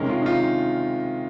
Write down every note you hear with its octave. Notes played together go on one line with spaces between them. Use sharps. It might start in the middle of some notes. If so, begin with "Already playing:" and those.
Already playing: C3 D#3 G#3 C#4 A#4
F4
D#4
F4